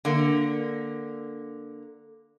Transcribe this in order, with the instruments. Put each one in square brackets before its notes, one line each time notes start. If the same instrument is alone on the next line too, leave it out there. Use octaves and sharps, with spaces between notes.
[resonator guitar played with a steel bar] D3 A#3